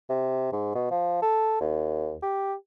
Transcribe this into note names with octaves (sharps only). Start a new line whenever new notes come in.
C3
G#2
B2
F3
A4
D#2
G4